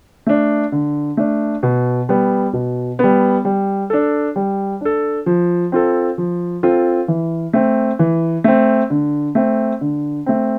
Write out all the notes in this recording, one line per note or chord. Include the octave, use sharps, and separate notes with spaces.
A3 D4
D3
A3 D4
B2
G3 B3
B2
G3 B3
G3
D4 A4
G3
D4 A4
F3
C4 F4 A4
F3
C4 F4 A4
E3
A3 C4
E3
A3 C4
D3
A3 C4
D3
A3 C4